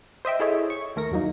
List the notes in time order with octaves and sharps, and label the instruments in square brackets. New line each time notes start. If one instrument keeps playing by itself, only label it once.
[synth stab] C5 D#5 E5 G5
E4 G#4 A4 C#5 D#5 E5
C#6
D#2 A3 A#4 A#6
E2 G2 F#3 A#3 D#4